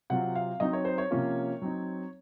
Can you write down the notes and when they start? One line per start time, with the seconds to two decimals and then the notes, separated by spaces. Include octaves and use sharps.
0.10 C3 F#3 C4 F4 F#5
0.35 F5
0.60 F#3 C4 D#4 D#5
0.73 C#5
0.85 C5
0.98 C#5
1.11 C3 F3 A#3 C#4 F4
1.62 F#3 C4 D#4